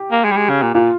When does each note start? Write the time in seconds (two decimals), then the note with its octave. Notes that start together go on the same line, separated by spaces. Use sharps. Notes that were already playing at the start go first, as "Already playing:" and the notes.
Already playing: G4
0.11 A#3
0.24 G#3
0.32 G3
0.37 G#3
0.49 C#3
0.62 A#2
0.74 A#2 F4